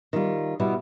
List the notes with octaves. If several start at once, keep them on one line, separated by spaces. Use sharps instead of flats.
D#3 G3 F4
B2 G3 B3 E4